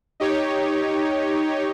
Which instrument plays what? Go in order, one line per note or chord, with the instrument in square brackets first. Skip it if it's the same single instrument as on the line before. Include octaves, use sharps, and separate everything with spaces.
[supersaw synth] D#4 G4 C#5